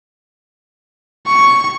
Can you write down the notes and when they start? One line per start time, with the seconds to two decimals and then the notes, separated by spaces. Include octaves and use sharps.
1.27 C#6